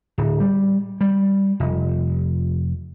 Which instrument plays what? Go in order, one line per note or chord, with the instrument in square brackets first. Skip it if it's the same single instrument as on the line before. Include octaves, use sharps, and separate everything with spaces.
[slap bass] D1
G3
G3
F1